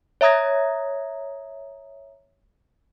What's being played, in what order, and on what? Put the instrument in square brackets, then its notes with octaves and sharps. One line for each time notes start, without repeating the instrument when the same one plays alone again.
[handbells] C#5 E5 A#5 D#6 G#6 A#6